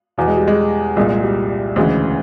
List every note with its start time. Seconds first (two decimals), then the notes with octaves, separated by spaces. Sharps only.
0.18 E2 B2
0.27 G#3
0.37 G3
0.48 G#3
0.96 C2 A#2 G#3
1.10 G#3
1.23 G3
1.76 D2 C#3 E3 G#3